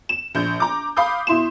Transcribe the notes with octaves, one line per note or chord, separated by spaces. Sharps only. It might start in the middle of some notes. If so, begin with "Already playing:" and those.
E7
A#1 G6
A#5 D6
F5 B5 D6 D#6 G6
B2 E4 C6 E7